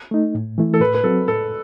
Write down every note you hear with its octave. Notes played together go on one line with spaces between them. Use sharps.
A3 D#4
A2
E3 A3 E4
A4
A2 B4
B4
F#3 C4 F#4 A4
A2 A4